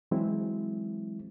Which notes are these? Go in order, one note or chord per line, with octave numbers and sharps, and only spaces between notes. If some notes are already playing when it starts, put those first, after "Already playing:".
E3 F#3 G#3 C4 E4